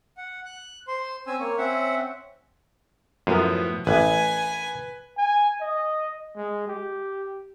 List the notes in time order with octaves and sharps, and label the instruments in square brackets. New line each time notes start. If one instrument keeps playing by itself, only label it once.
[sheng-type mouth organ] F#5
F#6
C5 C6
C4 C#4 G#5 E6
A#3 C#5
C4 C#4 E5 F#5
[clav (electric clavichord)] F#2 [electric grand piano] A2 F3 B3
[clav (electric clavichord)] A1 [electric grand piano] B4 [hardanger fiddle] G#5
[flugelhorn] G#5
D#5
G#3
G4